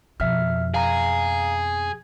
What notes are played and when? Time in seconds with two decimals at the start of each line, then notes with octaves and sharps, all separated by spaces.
0.20 F2 B2 E5 F6
0.74 G#4 F5 A#5